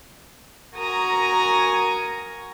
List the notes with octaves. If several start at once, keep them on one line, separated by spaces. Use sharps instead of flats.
F#4 A#4 F#5 G#5 A#5 D#6